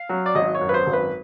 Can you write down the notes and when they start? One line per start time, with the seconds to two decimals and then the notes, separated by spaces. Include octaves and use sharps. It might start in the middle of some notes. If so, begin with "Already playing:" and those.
Already playing: F5
0.09 F#3
0.26 D5
0.35 G#1 D#5
0.55 C#5
0.61 F#2
0.69 B4
0.74 C5
0.87 G#1
0.93 B4